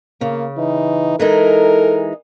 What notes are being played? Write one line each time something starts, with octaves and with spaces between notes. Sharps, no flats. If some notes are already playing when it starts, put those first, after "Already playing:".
C#3 A#3
E3 D#4
E3 G#3 D#4 A4 A#4